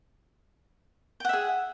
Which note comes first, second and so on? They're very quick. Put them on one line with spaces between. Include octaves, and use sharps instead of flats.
G5 F#5 E5 G#4